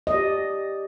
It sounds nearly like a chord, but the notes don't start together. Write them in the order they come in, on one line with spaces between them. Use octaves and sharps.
D#5 D5 G4